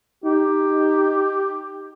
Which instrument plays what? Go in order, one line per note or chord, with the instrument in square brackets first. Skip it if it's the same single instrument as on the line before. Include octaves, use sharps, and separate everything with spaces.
[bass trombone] D#4 [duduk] G4